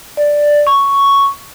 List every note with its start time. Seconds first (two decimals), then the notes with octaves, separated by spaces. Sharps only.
0.17 D5
0.67 C#6